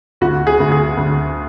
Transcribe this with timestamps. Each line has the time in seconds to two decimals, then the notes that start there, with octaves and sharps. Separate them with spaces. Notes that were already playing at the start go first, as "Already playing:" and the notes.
0.21 D2 F#4
0.47 G#4
0.60 D2
0.72 G#4
0.97 D2